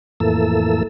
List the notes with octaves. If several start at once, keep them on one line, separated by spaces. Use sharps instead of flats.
F2 A2 E3 A#3 A4 E6